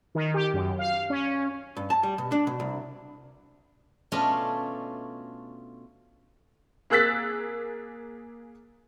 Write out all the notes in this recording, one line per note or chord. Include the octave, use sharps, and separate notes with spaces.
D#3
G4
F#2
F5
C#4
G2
A5
G3
B2
D4
B2
C2
B2 A3 C#4 D4 F4 D#5
A#3 G#4 E6 F#6 A6 B6